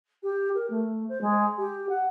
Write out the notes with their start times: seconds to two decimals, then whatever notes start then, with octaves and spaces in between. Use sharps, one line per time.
0.22 G4
0.54 A#4
0.70 A3
1.08 C5
1.20 G#3
1.57 G4
1.89 F#5